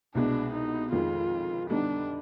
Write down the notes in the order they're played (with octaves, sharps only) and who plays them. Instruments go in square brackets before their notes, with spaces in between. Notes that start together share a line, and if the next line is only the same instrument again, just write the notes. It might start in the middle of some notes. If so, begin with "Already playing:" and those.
[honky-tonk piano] C2 B2 G#3 B3 [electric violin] D4
[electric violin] D#4
[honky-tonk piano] F2 D#3 G#3 [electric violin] F4
[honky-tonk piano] D3 G3 B3 D#4 [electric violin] D4